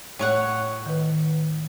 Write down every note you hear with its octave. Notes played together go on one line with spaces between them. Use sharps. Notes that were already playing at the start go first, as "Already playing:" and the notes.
A2 C#5 F#5
D#3 B4